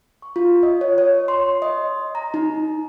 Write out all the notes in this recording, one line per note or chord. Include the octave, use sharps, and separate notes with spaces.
C#6
F4
D#5
C#5
C#5
C6
D#5
A#5
D#4